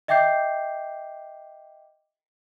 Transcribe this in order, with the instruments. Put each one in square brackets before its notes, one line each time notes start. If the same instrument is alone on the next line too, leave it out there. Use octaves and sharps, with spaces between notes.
[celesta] D#5 E5 G5 D6 G6 C7